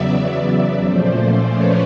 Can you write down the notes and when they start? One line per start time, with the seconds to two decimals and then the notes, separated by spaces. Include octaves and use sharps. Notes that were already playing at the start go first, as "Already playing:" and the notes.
Already playing: E2 C#3 F#3 B3 D5 E5
0.12 D5 E5
0.82 A#2 F3 A3 C#4 C5 D5
1.52 B4 C#5